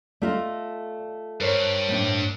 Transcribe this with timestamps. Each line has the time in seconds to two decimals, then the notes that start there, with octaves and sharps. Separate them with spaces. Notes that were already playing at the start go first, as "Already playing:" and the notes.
0.22 A3 F4 D5 D#5
1.41 G2 A#4 C5 C#5
1.88 A2 D4